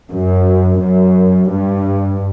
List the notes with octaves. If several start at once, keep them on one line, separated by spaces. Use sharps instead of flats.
F#2
F#2
G2